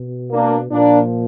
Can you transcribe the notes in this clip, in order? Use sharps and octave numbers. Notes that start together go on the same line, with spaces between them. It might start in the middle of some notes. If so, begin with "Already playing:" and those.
Already playing: B2
A#3 D4
A#2 F3 A#3 D4